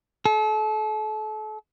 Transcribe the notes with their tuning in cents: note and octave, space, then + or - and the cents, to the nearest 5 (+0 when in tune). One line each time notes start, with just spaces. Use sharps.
A4 -35